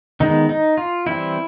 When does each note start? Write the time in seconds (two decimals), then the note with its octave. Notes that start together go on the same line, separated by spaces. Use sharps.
0.20 D#3 G#3 B3 D#4
0.49 D#4
0.77 F4
1.06 E3 G3 C4 E4